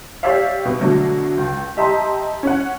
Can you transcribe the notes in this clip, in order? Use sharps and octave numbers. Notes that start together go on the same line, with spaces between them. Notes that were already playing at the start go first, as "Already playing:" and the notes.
G4 C#5 D5 E5 F5
B2 B3
B2 D3 F#3 A3
C#2
G4 D#5 E5 A5 A#5 C6
C#4 F#5